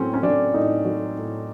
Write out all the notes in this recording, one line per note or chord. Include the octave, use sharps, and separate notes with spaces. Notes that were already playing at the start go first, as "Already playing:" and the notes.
Already playing: A2 F#3 C4 C#4
C#4
F#3 D4
A2 D#4
F#3
A2